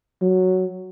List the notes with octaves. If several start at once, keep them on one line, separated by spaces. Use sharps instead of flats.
F#3